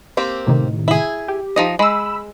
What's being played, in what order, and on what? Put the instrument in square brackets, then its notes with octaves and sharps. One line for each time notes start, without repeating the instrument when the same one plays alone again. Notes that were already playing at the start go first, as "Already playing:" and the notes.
[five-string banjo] A#3 C4 G4
[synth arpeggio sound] A2 C3 D#3
[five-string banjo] E4 G#4
[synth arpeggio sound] G4
[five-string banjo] F3 D#4 D#5
[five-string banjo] G#3 [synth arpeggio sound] B5 E6